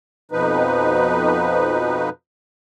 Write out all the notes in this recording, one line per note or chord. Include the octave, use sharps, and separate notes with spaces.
F2 B2 F3 D#4 B4